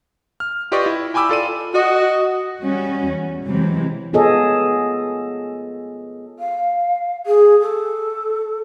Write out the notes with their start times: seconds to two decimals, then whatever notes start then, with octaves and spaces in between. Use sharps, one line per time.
0.40 F6
0.72 F4 G4 B4 D5 D#5 C#6
0.86 E4
1.14 G5 G#5 B5 D6 E6
1.29 F4 A4 D5 D#7
1.74 F#4 D#5
2.61 G3 C#4 F#4
3.08 E2
3.47 C3 E3 F#3 G#3 C4
4.13 B3 F4 G#4 A4 C#5 D#5
6.39 F5
7.26 G#4
7.61 A4